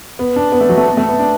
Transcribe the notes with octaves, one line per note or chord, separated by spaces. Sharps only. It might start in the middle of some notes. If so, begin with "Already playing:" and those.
B3
D4
B3
A3
F#3
A3
B3
A3
B3
D4